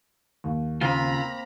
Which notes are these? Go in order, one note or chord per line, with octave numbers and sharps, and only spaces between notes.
D#2
C#3 A#3 C4 F4 A#5 B5